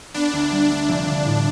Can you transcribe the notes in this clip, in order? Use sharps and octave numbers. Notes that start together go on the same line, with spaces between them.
B3 D4
D2
G3
A3 D4
F1
D3
A2